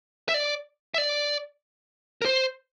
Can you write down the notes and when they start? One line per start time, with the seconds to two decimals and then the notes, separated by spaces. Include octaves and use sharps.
0.29 E5
0.34 D5
0.94 E5
0.98 D5
2.22 A#4
2.25 C5